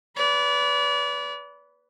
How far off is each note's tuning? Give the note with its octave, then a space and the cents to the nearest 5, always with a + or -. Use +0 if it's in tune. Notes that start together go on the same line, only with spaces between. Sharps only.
B4 +0 D5 -35